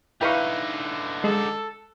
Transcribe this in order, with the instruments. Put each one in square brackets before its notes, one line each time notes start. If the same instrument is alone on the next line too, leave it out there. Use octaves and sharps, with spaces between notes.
[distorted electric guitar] D3 D#4 [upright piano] E4 B4 F5 [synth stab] G5 B5 C#6
[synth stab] G#3 [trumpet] A4